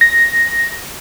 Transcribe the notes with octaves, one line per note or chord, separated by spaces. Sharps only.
A#6